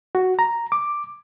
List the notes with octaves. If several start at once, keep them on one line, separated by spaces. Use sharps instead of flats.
F#4
A#5
D6